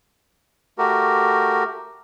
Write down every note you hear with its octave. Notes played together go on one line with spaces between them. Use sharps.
A3 F#4 G4 A#4